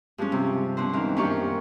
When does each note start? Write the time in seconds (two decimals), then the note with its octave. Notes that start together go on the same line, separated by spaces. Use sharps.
0.18 G2 F3 G#3 C#4
0.32 C3
0.77 B2 C#4 D4 C5
0.93 D#3 E3 F5
1.17 F#2 A#2 D4 G4 F5 C#6